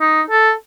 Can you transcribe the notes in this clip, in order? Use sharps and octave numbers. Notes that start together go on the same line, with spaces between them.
D#4
A4